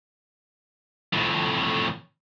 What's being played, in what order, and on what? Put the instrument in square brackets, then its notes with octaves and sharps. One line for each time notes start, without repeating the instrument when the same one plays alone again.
[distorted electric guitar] F2 A2